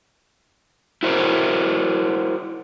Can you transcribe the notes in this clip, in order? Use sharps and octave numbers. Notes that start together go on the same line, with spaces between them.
E4 F#4 A#4 C5